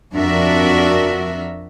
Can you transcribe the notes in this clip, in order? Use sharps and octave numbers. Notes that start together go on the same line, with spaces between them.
F2 D4 F#4 A#4 E5